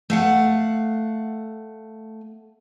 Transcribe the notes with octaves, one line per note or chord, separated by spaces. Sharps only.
A3 F5 F#5